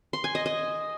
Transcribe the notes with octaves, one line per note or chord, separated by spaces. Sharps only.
C6
G#5
D#5
D#5